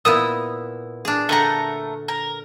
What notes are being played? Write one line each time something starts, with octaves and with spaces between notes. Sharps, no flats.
A#2 B3 E4 D#6 E6
D4 G#4
D3 A3 A#4 F#5 A#5
A#4